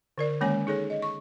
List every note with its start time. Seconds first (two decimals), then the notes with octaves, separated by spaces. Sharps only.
0.18 D3 A#4 D5
0.41 D#3 G#3 A#3 C#4 C#5 G#5
0.67 D#4 G#4 A4 C#5
0.90 D#5
1.02 C#6